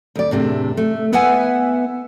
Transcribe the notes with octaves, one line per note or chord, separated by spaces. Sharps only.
D2 D5
E2 A2 C3 D4
A3
B3 E4 B4 E5 F#5 G#5